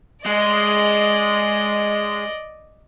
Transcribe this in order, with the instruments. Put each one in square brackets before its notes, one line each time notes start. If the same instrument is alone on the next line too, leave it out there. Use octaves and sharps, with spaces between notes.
[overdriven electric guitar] G#3 [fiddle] D5 D#5